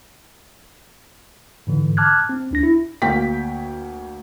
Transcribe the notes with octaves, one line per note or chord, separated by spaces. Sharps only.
G#2 D3 E3
A5 D6 F6 F#6 G#6
C4
D2 D4 A#6
E4
D2 A#3 F#4 G5 B6